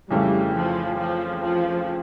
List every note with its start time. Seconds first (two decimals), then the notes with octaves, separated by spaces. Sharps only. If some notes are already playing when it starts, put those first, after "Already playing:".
0.10 F2 C#3 E3 G3 A3
0.54 F3
0.97 F3
1.41 F3